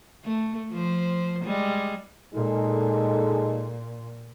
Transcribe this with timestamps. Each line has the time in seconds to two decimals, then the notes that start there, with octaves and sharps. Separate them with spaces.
0.25 A3
0.72 F3 C5
1.44 G3 G#3
2.34 A#2 G#3 D#4 A4